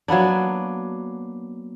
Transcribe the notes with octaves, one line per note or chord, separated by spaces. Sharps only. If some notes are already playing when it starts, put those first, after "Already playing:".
F#3 A#3 B3 D4